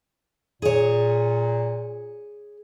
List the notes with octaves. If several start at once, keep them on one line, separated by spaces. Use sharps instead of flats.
A#2 G#4 C#5